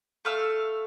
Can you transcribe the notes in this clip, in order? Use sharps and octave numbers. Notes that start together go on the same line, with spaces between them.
A3 F5 E6